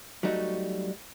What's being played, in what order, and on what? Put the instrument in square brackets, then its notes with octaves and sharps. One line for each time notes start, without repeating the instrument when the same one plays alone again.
[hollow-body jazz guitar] F#3 G3 A3 D#4 F#4